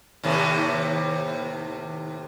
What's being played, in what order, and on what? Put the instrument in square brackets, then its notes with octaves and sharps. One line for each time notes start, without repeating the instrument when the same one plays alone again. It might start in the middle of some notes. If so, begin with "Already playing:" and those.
[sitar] D#2 A2 C3